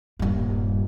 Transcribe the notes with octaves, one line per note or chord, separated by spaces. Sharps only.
D#1 G2